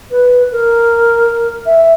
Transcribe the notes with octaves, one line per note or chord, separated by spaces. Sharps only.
B4
A#4
E5